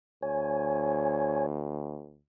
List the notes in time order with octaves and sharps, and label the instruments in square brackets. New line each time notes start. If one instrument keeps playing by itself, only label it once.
[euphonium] D2 [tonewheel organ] C#5 G#5